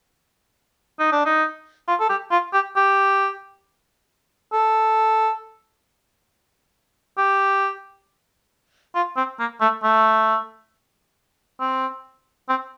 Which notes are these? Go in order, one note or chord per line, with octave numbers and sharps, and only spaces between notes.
D#4
D4
D#4
F4
A4
G4
F4
G4
G4
A4
G4
F4
C4
A#3
A3
A3
C4
C4